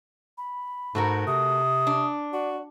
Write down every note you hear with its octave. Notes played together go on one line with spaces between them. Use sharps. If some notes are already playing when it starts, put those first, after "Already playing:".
B5
G#2 A3 F#4 A#4
C3 D#6
D4
F#4 D5